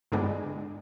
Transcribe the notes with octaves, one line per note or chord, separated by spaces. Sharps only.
G2 D3 G#3 B3 D4